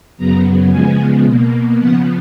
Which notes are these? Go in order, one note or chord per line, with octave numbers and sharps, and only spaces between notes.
F#2 C#3 F#3 B3 A#5
C#3 F3 G#3 B3 G#5
B2 A#3
C#3 F3 B3 F#5